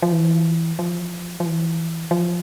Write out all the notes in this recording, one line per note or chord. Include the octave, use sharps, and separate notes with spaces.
F3
E3
F3
F3
E3
F3